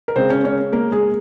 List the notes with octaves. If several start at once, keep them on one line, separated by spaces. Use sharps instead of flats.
A#4
C#3 G#3 C4 C5
C#4 C#5
C#4 C#5
A#3 A#4
G#3 G#4